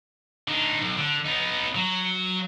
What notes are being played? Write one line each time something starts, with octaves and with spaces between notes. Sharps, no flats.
D3 D#4
B1
D3
B3 D#4
F#3